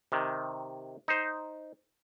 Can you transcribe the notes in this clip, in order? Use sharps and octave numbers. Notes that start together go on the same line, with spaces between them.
C3 D#3
D#4 C5